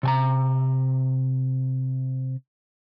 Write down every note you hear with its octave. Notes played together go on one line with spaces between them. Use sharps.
C3 G#5 A#5